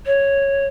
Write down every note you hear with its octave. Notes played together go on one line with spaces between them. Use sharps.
C#5